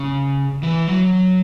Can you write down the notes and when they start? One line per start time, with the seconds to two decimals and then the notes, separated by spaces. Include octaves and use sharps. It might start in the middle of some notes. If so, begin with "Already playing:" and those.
Already playing: C#3
0.63 E3
0.87 F#3